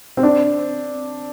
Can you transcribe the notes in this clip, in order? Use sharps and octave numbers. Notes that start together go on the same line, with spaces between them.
C4
D4